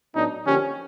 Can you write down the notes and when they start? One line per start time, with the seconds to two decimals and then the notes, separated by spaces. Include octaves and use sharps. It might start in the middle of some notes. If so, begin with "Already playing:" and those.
0.15 A2 F#3 B3 D4 D#4
0.46 D3 F3 A#3 C#4 D4 G4